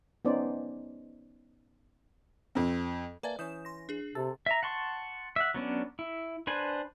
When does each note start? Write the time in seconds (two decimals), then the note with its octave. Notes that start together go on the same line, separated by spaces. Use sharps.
0.25 B3 C#4 D#4 C5 D5
2.55 F2 C4
3.23 A#3 B4 D5 E5 G#5 A5
3.39 E3 C#4 D#6 G6 E7
3.65 C6 A#6
3.89 D4 G#4
4.15 C3 A4 A6
4.46 E5 A#5
4.63 F#5 A5 C6 C#6
5.36 E5 F#5
5.54 F#3 B3 C#4 D4
5.99 E4
6.47 D4 B4 C5 G#5